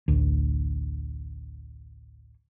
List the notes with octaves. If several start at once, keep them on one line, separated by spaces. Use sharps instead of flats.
A1 D2